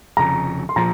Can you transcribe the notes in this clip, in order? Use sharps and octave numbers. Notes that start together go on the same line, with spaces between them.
F1 F2 C#3 A#5
C6
A#2 F3 A#5